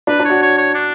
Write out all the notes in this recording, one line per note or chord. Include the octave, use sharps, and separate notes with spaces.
D4 B4
D4
F#4 C#5
C#5
C#5
D4